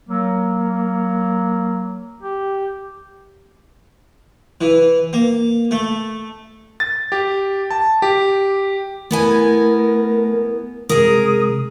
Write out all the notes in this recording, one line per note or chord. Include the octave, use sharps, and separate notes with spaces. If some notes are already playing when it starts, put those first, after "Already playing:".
F#3 A#3
G4
E3
A#3
A3
A6
G4
A5
G4
A3 B3 E4 A#4 G#5
C3 G#3 G#4 A#4 D#6